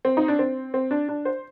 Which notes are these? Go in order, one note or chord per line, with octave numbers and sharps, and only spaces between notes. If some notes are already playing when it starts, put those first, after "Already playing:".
C4
D#4
D4
C4
C4
D4
D4
C5